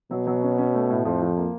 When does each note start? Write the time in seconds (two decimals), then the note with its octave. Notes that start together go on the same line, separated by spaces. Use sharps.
0.11 B2 F#3
0.27 F#3
0.43 C#4
0.58 C#4
0.74 A3
0.90 A2
1.05 F2 F3
1.22 F3
1.37 A#3